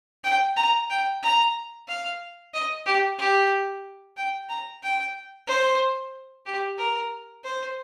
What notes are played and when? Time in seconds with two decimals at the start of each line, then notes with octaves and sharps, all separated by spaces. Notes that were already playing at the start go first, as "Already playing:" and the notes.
0.24 G5
0.56 A#5
0.90 G5
1.23 A#5
1.88 F5
2.53 D#5
2.86 G4
3.18 G4
4.17 G5
4.49 A#5
4.82 G5
5.47 C5
6.46 G4
6.78 A#4
7.44 C5